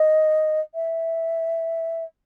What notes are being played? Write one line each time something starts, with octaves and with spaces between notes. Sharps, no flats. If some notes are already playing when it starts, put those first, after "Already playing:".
Already playing: D#5
E5